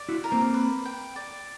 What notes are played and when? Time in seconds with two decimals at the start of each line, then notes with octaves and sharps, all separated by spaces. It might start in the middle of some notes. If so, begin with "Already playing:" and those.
Already playing: D5
0.09 E4 F#4
0.24 A#4
0.32 A#3 C4
0.54 B4
0.85 G5
1.16 D5